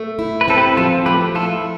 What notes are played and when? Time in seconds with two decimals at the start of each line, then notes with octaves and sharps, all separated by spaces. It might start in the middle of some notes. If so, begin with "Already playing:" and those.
Already playing: A3
0.19 E4
0.41 B4
0.48 C4 A4
0.58 G4 B4
0.77 F3 F4 A4
1.06 A3 G4 B4
1.35 E4 F4 A4